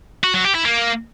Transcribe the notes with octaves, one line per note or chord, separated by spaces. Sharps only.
F#4
F#3
G4
E4
A#3